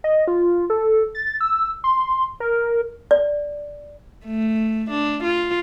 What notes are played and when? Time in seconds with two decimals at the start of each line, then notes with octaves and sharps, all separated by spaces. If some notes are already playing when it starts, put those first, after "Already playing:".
0.04 D#5
0.28 F4
0.70 A4
1.15 A6
1.41 E6
1.84 C6
2.40 A#4
3.11 D5
4.25 A3
4.90 D4
5.24 F4